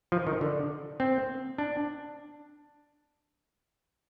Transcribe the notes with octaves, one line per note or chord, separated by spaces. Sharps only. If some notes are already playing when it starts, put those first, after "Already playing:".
F3
D#3
D3
C4
D4